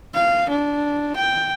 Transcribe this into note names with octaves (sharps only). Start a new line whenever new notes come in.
F5
D4
G5